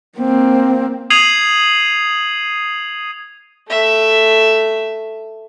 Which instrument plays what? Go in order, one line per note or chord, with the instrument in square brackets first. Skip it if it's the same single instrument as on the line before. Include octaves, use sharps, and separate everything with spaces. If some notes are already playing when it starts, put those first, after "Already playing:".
[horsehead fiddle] A#3 C4
[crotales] D#6 G#6 C7 D#7 F7 F#7
[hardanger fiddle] A3 E5